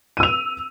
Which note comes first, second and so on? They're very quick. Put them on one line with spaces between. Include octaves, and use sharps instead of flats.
D#7 E6 F7